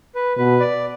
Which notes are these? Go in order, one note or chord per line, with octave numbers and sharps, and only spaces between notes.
B4
B2 B4
D5